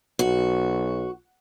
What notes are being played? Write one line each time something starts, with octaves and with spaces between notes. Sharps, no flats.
B1 F#4